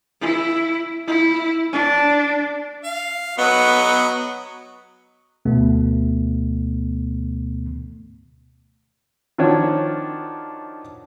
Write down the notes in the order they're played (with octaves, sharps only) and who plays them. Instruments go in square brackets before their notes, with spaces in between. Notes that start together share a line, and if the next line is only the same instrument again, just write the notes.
[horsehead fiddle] E4
E4
D4
[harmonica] F5
[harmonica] F#3 D#5 [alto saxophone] B3
[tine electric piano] D2 B2 A3 B3
[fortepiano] D#3 F3 D4 F#4 C#5